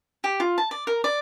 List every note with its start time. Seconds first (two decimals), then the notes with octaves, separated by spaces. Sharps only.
0.24 G4
0.40 F4
0.58 A5
0.71 D5
0.87 A#4
1.04 D5